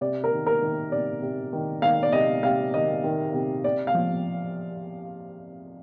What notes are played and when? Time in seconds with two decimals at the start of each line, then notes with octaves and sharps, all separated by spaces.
0.01 C3 D5
0.24 A#4
0.32 D#3
0.46 A#4
0.62 D#3
0.92 C3 D5
1.22 C3
1.53 D#3
1.82 D#3 F5
2.03 D5
2.13 C3 D#5
2.43 C3 F5
2.74 D#3 D#5
3.04 D#3
3.34 C3
3.64 C3 D5
3.87 F5
3.94 F3